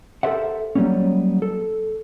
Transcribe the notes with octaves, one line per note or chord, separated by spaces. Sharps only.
G4 A4 A#4 C5 E5 F#5
F#3 G3 A#3 B3 C#4
A4